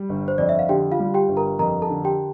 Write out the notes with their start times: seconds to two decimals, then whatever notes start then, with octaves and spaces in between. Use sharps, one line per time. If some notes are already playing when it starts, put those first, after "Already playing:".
Already playing: G3
0.09 G1
0.28 C5
0.38 F2 D5
0.49 E5
0.59 F5
0.69 D3 G4 G5
0.92 F4 F5
1.00 G3
1.14 G4 G5
1.29 G1
1.37 A#4 A#5
1.59 F2 A#4 A#5
1.82 A4 A5
1.90 D3
2.04 G4 G5